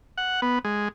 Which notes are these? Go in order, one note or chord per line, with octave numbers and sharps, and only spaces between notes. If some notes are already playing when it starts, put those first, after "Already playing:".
F#5
B3
G#3